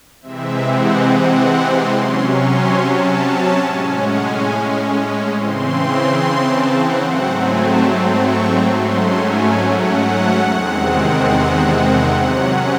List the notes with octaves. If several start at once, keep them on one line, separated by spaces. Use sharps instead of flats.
C3 E3 G#3 C4 E5
F#5
F#5
F#5
C6
C3 F#3 C#4 C6
C#6
C6
A5
A2 G#3 C#4 G#5
F#5
G#5
C#3 E3 C4 C6
C6
A5
F#5
G#2 F#3 A3 C4 F#5
G#5
A5
C6
C#6
G#2 F#3 A3 C#4 C6
G#5
F#5
E2 C3 D#3 G#3 C4
C3 F#3 C#4